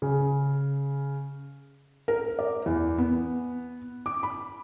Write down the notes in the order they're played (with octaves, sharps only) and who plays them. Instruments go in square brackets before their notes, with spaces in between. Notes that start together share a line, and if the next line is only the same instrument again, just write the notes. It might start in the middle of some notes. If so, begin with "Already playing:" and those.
[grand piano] C#3
[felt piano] A#4
D5
E2
B3
D6
B5